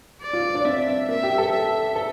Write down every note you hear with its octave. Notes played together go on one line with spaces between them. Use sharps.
D5
F4
D4
C4 E5
A#3 E5
G4
A4
E5
A4